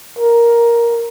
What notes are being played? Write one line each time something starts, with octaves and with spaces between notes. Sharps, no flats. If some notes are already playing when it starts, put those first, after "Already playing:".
A#4